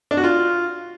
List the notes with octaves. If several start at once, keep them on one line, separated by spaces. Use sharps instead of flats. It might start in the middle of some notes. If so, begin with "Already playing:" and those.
D4
F#4
F4